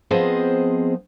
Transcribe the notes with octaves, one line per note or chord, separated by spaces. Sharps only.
F3 B3 C4 G#4 C5 D#5